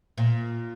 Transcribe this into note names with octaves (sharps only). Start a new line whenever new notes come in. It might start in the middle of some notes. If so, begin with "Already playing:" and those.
A#2